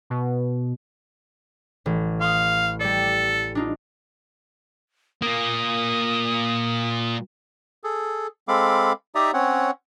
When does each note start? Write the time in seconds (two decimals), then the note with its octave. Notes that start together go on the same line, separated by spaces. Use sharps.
0.10 B2
1.86 A1
2.21 F5 C6 D#6
2.80 G3 A4 D5
3.55 D4 D#4 F4
5.22 A#2 A#3 D#6
7.84 G#4 A4
8.48 G#3 C4 A4 F5 B5 D6
9.15 D#4 G4 D5 E5 A#5 D#6
9.34 C4 C#4 C#5 F#5